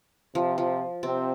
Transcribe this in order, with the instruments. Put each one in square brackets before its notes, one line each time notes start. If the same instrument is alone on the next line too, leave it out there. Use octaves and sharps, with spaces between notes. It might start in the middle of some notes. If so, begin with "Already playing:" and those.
[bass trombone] C3 [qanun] F3
[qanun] F3
[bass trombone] C3 [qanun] C4